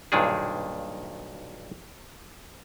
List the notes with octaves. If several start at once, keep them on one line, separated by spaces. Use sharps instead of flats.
B1 G2 A#2 D#3 D4 G#4